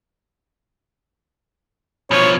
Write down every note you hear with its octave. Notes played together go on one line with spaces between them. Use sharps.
B2 F3 C#5